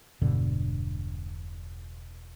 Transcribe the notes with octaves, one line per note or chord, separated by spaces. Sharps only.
E1 G2 B2 D3